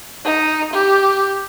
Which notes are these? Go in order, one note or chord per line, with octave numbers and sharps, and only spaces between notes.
D#4
G4